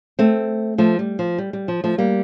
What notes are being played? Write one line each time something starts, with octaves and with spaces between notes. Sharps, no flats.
A3 C4
F3 A3
G3
F3
G3
G3
F3
F3 A3
G3 A#3